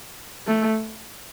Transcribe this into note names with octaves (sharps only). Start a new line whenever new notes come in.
A3